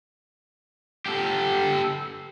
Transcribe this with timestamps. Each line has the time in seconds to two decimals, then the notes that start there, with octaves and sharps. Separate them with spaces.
1.06 G4 A4